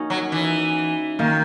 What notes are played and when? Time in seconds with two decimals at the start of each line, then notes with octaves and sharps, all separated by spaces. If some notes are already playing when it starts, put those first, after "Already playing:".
Already playing: A#3 C#4 D#4 F#4
0.10 F#3
0.32 E3
1.19 D#3 A#3